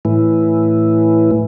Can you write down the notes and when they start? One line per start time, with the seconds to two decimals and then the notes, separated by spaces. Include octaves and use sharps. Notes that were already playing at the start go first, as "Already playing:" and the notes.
0.05 A2 E3